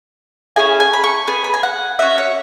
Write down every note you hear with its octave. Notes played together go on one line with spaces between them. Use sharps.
C#4 E4 G#4 G#5
G#5
B5
C#6
B3 G#4 G#5
B5
G#5
F#5
C#4 F#4 E5
C#5